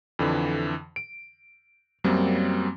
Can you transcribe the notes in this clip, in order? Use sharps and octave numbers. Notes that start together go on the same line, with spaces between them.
F2 D3 E3
D7
F#2 F#3 G3 A#3 C4